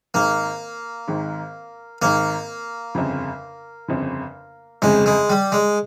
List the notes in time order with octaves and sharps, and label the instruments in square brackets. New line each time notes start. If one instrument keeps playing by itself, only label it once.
[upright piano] G#1 G#2 D#3 [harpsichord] A#3
[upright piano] G#1 G#2 D#3
[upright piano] G#1 G#2 D#3 [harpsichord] A#3
[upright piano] G1 F2 C#3
G1 F2 C#3
[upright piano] G1 F2 C#3 [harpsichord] G#3
[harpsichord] G#3
G3
G#3